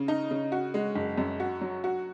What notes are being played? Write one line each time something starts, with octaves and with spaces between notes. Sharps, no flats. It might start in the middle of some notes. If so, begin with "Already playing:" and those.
Already playing: C#3
D#4
C#3
F#4
G#3
F#1
F#2
F#4
F#3
F#4